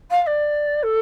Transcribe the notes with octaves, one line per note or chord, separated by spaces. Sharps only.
F5
F5
D5
A4